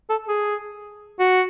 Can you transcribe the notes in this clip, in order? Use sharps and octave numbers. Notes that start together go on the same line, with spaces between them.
A4
G#4
F#4